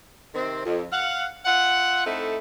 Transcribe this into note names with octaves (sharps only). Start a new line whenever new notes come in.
C3 D#3 C4
F2
F5 F#5
F4 E5 F#5
A3 C4 D#4 E4 A4